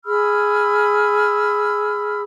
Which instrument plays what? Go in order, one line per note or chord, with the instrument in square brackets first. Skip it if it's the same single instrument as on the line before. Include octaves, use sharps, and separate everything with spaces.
[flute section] G#4 B5 E6 F6